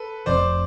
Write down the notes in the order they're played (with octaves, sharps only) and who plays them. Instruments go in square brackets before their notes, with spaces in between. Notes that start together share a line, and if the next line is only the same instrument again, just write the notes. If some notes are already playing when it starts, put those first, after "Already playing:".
Already playing: [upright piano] A4 B4
[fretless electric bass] F1 F2 C3 [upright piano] C5 D5